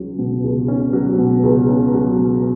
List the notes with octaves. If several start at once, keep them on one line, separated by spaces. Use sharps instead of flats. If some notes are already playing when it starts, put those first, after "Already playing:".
Already playing: C#2 F#3 C#4
B2
C#2
C#4
F#3
B2
C#2
C#4
F#3
B2